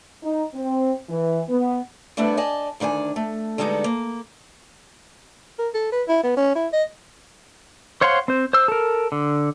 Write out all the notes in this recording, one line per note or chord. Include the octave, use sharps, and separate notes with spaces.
D#4
C4
E3
B3
G3 A3 B3 C4 D4 E4
D5 D#5 G#5 A5
D2 D#3 D4 A#4 G#5
A3
D3 G3 G#3 B3 D#4 A4
A#3
A#4
A4
B4
E4
B3
C#4
E4
D#5
C5 C#5 F5 F#5 C6
C4 C5
C5 E6
A4 A#4
D3